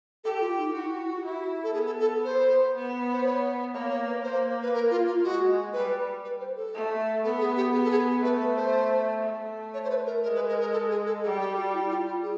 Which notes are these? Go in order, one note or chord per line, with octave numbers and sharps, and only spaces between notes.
G4 A4
F4
D#4
E4 F#4
E4
F4
G4
E4 F#4
A4
B3 G#4
A4
A4
C5
B3
C5
C#5
A#3 C#5
C#5
B4
A#3 C5
B4
A#4
F4
F4
G#3 F#4
G3 B4
B4
C5
A4
A3
B3 A4
G#4
G4
B3 G#4
A4
G#4
A3 B4
B4
C5
A3
C#5
C5
B4
A#4
G#3 A#4
B4
A#4
A#4
A4
G#4
A4
G3 G#4
G4
F#4
E4
F4
F4
G#4